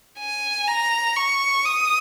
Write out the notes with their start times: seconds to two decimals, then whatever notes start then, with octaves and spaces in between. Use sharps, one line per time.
0.19 G#5
0.67 A#5
1.16 C#6
1.65 D#6